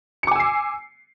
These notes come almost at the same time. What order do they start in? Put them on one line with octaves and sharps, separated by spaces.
C#7 D6 G#5 E6 C7